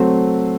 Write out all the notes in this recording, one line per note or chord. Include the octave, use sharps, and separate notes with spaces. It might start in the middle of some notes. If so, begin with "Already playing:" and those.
Already playing: F#3 A3 C4